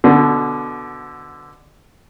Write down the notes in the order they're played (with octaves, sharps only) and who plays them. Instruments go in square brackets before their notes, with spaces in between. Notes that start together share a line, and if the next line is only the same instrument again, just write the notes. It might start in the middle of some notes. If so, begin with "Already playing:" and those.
[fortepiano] B2 D3